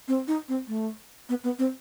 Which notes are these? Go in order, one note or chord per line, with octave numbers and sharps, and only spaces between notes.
C4
D#4
C4
A3
B3
B3
C4